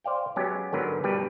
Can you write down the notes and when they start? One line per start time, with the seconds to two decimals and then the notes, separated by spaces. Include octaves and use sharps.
0.04 C5 D5 F5 G5
0.36 F#3 G#3 B3 C#4 G4
0.73 G#2 D3 F#3 B3 A#4 B4
1.04 G2 B2 G3 G4 B4